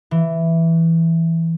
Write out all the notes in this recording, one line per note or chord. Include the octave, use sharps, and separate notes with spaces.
E3